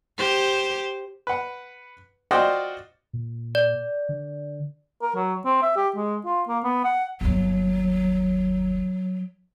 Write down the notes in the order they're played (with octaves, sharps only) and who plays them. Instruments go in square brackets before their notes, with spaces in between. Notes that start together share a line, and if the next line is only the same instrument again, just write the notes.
[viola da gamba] G4 C5
[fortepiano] B4 F#5
F4 F#4 C5 D5 D#5 G5
[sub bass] A#2
[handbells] D5
[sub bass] D3
[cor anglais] A#4
F#3
C4
E5
G4
G#3
F4
A#3
B3
F#5
[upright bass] G1 D#2 [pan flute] F#3